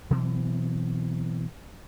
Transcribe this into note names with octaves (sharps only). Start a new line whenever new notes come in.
B2 E3 F#3 C4